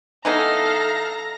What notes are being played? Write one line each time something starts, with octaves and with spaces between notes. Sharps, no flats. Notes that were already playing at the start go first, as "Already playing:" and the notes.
E3 B3 D#4 A4 F5 A#5 A#6